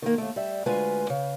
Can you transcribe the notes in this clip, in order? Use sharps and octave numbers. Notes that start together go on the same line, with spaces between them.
D#3 A#3
D#2 A3
G3 E5
D2 G#3 F4 B4 G#5
C#3